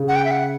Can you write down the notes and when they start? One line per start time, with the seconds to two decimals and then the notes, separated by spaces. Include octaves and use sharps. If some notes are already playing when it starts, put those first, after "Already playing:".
Already playing: C#3
0.08 F#5
0.16 G5
0.25 E5
0.31 F#5